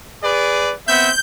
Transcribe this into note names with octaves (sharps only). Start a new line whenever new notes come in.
G#4 B4 D5
B3 C4 E5 G6